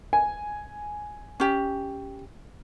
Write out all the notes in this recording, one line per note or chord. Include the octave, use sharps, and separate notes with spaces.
G#5
C#4 G4